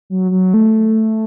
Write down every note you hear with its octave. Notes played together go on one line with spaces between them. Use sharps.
F#3
F#3
A3